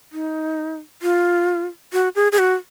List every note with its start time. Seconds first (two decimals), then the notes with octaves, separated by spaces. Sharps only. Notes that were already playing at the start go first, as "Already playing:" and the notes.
0.12 D#4
1.02 F4
1.93 F#4
2.15 G#4
2.32 G#4
2.39 F#4